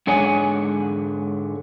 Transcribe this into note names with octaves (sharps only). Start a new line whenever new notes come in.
G#2 D3 G#4 C#5 F#5 G#5